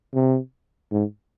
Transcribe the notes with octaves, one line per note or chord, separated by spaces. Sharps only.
C3
G#2